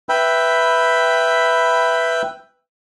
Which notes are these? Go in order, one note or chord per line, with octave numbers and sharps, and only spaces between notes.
B4 E5 G5 B5